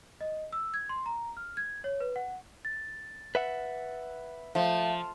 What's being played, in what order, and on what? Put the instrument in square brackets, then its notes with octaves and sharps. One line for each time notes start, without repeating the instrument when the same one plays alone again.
[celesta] D#5
E6
G#6
C6
A#5
F6
G#6
C#5
B4
F#5
A6
[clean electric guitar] B4 E5 F#5
[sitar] F3 [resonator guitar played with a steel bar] A3 [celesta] E5 F5